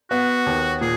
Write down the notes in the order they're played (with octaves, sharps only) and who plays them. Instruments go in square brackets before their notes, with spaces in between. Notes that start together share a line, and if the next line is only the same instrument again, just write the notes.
[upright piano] B3 [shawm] F#4
[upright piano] D#2
[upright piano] A#2 [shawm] G#4